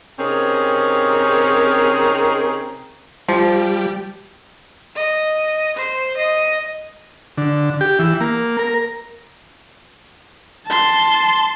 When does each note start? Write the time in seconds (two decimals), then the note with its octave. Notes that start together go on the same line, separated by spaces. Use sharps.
0.19 C3 C4 C#4 D#4 G#4 A#4
3.28 F3 G3
4.96 D#5
5.77 C5
6.17 D#5
7.38 D3
7.81 G4
7.99 E3
8.21 A#3
8.59 A#4
10.66 A5 C6